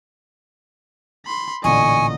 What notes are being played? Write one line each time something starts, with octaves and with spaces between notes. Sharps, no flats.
B5 C6
A1 A#2 D3 D#5 G#5 C#6